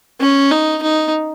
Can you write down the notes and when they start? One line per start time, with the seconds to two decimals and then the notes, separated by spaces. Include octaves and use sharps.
0.20 C#4
0.51 D#4
0.82 D#4